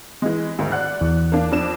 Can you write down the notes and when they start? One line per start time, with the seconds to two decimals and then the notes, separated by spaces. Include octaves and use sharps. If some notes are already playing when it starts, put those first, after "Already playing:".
0.22 E3 G#3
0.59 D2 G#2 D#3
0.72 D5 F#5 F#6
1.01 E2
1.32 A#3 D4
1.52 F2 D4 E7